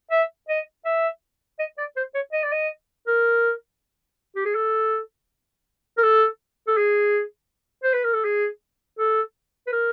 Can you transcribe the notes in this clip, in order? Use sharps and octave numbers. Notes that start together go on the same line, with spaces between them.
E5
D#5
E5
D#5
D5
C5
C#5
D#5
D5
D#5
A#4
G4
G#4
A4
A#4
A4
A4
G#4
C5
B4
A#4
A4
G#4
A4
B4
A#4